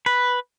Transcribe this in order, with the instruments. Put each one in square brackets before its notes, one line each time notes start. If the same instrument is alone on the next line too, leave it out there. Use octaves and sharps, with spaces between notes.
[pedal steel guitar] B4